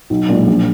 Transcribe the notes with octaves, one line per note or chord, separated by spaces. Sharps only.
B1
A#2 G#3 D4
A#1